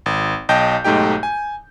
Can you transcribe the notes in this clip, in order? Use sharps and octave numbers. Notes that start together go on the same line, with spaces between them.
G#1
B1 D#5 G5 A5 G6
B1 G#2 A3 D#4 G4 G5
G#5